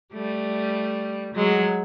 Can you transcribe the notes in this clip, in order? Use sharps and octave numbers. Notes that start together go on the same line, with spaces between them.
G3 A3
F#3 G#3